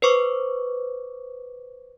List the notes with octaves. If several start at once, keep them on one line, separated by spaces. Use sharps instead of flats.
B4 C5 C#6 D6